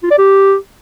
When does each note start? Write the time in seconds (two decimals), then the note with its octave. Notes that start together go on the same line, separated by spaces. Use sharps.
0.03 F4
0.11 D5
0.18 G4